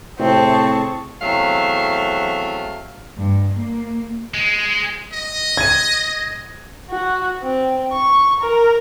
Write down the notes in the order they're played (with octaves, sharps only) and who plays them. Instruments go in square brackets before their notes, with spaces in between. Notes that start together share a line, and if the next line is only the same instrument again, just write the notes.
[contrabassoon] A2 [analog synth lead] C3 [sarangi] C4 [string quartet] G#4 A5 C#6
[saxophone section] E2 C3 F#3 A3 E5 F5
[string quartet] G2
A#3
[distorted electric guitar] G#3
[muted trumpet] D#5
[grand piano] G#6 D#7
[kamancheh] F#4
C4
C#6
A#4